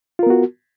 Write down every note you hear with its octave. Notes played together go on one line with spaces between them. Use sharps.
B3 F4 F#4 A#4